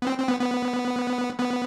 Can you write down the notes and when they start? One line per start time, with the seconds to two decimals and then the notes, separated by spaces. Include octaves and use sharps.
0.02 B3
0.07 C4
0.18 C4
0.28 B3
0.40 B3
1.39 B3